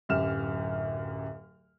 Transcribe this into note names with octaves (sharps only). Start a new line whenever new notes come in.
D1 F#2 G4 F6 E7